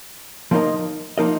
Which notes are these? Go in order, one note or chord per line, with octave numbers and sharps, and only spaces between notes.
F3 A#3 D#4 A#4 D#5
F3 A#3 D#4 A#4 D#5